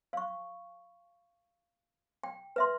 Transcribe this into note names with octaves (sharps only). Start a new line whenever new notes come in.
F5 C#6
G5
B4 E5 C6